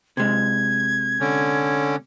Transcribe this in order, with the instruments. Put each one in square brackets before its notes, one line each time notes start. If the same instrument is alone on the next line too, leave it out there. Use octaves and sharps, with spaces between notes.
[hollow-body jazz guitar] C3 G#3 [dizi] G#6
[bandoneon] D3 C#4